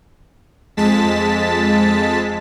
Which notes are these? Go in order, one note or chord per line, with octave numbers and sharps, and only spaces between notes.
F2 G#3 A5 A6 B6